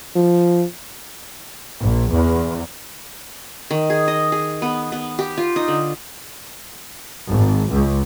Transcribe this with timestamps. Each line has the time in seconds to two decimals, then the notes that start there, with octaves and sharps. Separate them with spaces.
0.16 F3
1.80 A#1
2.11 E2
3.71 D#3
3.90 G#4
4.08 D#5
4.32 G#4
4.62 B3
4.92 B3
5.19 G4
5.38 F4
5.56 D#4
5.68 D3
7.29 G#1
7.71 C#2